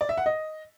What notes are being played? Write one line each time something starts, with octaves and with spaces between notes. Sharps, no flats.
D5
E5
F#5
D#5